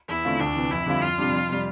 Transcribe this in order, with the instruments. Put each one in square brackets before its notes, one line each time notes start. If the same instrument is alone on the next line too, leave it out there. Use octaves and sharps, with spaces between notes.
[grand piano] E2 [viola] E4
[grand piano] D3 A3 C4 F4
[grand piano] D2 [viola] D4
[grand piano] C3 E3
[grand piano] F2 [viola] E4
[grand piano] D3 G3 C4 F4
[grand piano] F2 [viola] F4
[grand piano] C3 G3 D4
F2
C3 G3